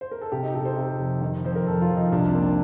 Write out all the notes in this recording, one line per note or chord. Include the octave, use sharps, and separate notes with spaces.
C5
A#4
A4
C3 G4
D#4
C3 A4
C5
C3
F1
D#3
F2 C5
A#4
F2 A4
F4
F2
D#4
C2 D4
C4
A#3
D4